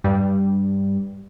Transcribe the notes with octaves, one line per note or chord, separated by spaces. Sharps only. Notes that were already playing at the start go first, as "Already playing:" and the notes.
G2 G3